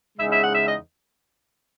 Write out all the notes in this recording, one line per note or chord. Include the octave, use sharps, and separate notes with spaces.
E2 C#3 G#3 D#4 E5
E5
F#5
E5
D#5